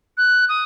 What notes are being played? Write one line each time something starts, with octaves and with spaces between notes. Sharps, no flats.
F#6
D#6